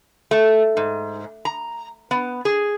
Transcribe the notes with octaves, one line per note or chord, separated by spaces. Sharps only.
A3
G#2
A#5
B3
G#4